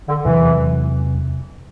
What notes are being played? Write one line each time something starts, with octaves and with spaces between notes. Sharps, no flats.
D3
E2 C3 E3 F#3